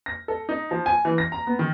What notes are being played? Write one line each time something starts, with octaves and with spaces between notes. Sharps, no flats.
A#6
A4
D#4
F3
G#5
E3
A#6
A#5
B3
D#3